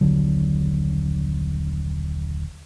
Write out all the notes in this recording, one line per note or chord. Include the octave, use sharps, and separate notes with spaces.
D#1 B1 D3 F#3